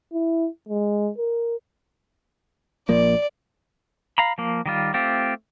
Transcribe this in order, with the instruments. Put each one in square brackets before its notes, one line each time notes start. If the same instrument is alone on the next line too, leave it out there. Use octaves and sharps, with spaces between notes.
[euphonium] E4
G#3
A#4
[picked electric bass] A#1 F3 A#3 [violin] D5
[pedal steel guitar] F5 A#5 B5
F3 A#3
D#3 G3 F4
A3 C4 F4 G4